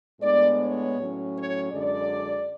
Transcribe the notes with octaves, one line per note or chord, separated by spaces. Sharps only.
A2 G#3 B3 D4 D5
C#5
A2 F#3 C#4
C#5
F#2 D3 G#3 D5